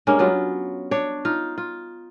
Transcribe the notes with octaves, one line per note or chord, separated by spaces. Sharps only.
G2 G#3 A#3 C#4
F#3 B3 F4
D4 C#5
D#4 F4 F5
F4